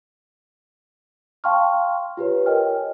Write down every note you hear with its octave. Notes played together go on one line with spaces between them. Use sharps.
F5 G5 A5 C6 C#6 F6
F4 G4 B4 C#5
A#4 C#5 D#5 G5 G#5 F6